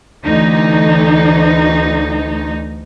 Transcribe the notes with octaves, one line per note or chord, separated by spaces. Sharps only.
D2 E3 D#4